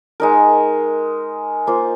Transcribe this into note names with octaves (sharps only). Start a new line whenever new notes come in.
G#3 D#4 A#4
A#3 F4 C5